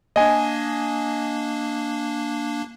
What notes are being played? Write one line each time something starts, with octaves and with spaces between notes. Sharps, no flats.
A#3 D4 D#5 G#5